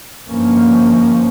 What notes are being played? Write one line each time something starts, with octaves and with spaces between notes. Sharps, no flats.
G1 G2 F3 A#3 C#4